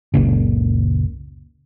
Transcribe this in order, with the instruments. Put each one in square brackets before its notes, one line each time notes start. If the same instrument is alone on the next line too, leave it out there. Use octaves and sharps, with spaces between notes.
[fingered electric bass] F#1 C#2 A#2 C#3